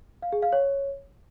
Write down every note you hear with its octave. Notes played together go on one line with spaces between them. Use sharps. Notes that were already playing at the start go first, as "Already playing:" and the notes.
F5
G#4
F5
C#5